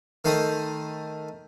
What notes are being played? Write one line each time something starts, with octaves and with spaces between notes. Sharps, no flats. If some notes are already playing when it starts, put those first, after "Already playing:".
D#3 A3 C5 D#6